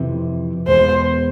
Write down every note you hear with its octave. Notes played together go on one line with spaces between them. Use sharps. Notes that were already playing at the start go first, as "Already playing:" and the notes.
Already playing: F2 C3 E3
E2 B2 G#3 B3 C5